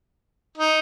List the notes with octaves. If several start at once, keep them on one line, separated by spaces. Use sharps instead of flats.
D#4